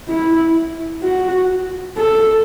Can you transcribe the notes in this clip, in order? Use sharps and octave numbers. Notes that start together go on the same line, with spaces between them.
E4
F#4
A4